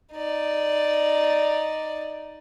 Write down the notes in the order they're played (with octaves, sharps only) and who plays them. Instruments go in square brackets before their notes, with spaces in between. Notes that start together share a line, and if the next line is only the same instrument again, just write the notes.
[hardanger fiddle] D#4 D5